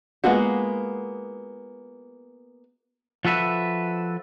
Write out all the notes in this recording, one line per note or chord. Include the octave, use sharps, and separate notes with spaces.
G#3 A#3 B3 F4 F#4
F3 F#4 A4 B4 E5